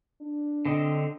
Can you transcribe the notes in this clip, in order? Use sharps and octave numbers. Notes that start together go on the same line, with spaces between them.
D4
D3 C4 D#5